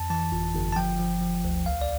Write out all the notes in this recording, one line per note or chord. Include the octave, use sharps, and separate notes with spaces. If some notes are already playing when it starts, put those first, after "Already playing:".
Already playing: F2 A5
E3 A5
G1
G1
A5
F3 G5
F3
F3
D2
C2 F5
D5